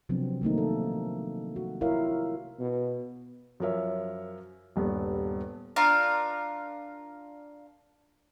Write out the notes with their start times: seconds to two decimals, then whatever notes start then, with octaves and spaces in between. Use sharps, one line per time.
0.09 C3 F3 F#3 B3 C4 D4
0.42 D#3 A3 A#3 D#4
0.58 A4
1.56 F#4
1.81 E4 F4 A#4 C#5 E5 F5
2.59 B2
3.60 F#2 F3 A#4 C#5 E5
4.76 D#1 G2 B3
5.76 D4 F4 A#4 F5